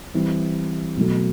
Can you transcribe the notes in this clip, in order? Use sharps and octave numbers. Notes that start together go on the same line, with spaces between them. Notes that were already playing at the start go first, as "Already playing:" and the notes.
E3 G3 C4 E4
B2 F#3 A3